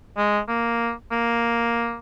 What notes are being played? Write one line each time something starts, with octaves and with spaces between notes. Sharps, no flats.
G#3
A#3
A#3